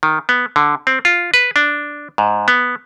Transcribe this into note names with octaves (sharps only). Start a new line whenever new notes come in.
D#3
B3
D3
C4
F4
B4
D4
G#2
B3